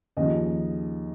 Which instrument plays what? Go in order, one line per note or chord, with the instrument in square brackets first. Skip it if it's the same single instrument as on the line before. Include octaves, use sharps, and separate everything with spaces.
[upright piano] D#2 C#3 F3 D#5